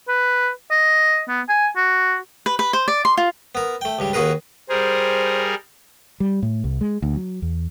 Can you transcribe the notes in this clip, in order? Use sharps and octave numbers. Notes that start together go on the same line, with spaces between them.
B4
D#5
B3
G#5
F#4
B4
B4
C5
D5
C6
F4
B3 A#4
A3 G5
C#2 G2 G3
D#2 A#3 F#4 G#4 A#4 B4
G3 G#4 A#4 C5
G3
A2
C2
G#3
D2
F#3
E2